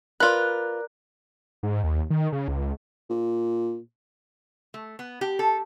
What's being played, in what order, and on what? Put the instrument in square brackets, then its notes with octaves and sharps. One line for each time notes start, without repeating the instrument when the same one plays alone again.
[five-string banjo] F4 B4 [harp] A#4 D5 [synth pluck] F#6
[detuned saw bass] G#2
D#2
D#3
C#3
C#2
[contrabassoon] A#2
[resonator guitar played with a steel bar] A3
B3
G4
A4